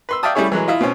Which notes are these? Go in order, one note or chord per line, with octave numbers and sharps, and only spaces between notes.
B4 C6 E6
D5 E5 F5 G5 A5 D#6
G3 A3 C#4 E4 G#4 C#5
E3 F#3 G#3
E4 F4 D#5
B2 C4 C#4